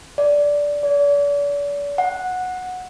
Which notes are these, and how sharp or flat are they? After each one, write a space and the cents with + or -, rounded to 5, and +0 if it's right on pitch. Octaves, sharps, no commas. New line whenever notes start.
D5 -10
D5 -40
F#5 -10